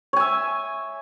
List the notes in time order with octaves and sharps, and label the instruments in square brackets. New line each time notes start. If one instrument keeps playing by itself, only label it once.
[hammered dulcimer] C#5
G#5
E5